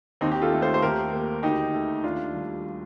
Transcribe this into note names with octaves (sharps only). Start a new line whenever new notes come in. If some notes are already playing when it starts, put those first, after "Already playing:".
D#2 C4 D#4
G4
F4 A4
A3
A4 C5
C5
D#2 G4 A#4
A#3
D2 D#4 G4
A3
D#2 D4 F4
G3